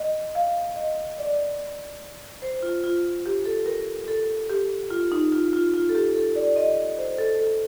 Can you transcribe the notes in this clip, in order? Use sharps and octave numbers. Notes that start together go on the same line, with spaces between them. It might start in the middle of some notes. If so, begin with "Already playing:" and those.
Already playing: D#5
F5
D#5
D5
C5
F4
F4
G4
A4
A#4
A4
G4
F4
D#4
F4
F4
F4
A4
G4
A4
D5
D#5
C5
A4
A4